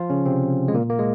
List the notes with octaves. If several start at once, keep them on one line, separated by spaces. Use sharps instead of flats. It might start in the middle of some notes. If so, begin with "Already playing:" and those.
Already playing: F3 F4
C#3 C#4
C3 C4
G#3
A#2 A#3
A#3
G#3